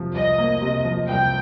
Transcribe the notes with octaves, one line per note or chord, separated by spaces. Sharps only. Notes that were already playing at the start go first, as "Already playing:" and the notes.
Already playing: C3 F3
C2 D#5
A#3
C3
F3
C2 G5